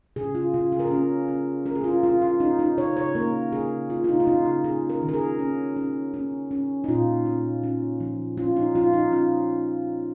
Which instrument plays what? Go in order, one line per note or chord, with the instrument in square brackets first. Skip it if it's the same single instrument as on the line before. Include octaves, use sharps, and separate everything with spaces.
[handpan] C#3 G#4
F4
C#3 F4
G#4
A#4
C#4 G#4
C#4
C#4 A#4
G#4
F4
C#4 F4
F4
C#4 D#4
D#4
C#3 C#5
C#5
A#3 A#4
C#3 G#4
C#3 F4
F4
D#4
F4
C#3 D#4
F4
C#4 G#4
A#4
D#3
A#4
G#4
C#4
C#4
C#4
C#4
D#4
A#2 F4
C#4
C#4
F3
C#4 F4
D#4
F3 F4
D#4
C#4 F4